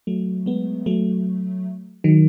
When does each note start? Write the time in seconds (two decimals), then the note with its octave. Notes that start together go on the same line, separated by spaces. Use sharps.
0.07 F#3 A3
0.46 G#3 B3
0.86 F#3 A3
2.04 D#3 F#3